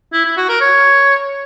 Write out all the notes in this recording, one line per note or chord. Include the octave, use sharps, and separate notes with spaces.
E4
E4
F#4
A#4
C#5